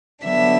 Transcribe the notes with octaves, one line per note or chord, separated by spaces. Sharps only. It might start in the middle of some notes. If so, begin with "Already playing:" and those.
D3 F#3 B3 D4 E5